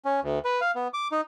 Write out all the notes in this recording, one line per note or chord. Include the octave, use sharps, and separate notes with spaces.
C#4
D2
B4
F5
B3
D6
D#4